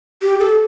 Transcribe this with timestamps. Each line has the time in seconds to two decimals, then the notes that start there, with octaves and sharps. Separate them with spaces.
0.22 G4
0.40 A4